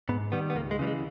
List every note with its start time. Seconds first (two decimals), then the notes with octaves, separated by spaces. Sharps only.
0.09 G#2 B3
0.32 D#3 G3 B3
0.50 B3
0.55 C#2 A#3
0.71 G#3
0.79 C#3 E3 G3
0.87 G#3